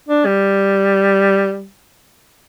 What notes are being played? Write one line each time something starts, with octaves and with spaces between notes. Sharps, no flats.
D4
G3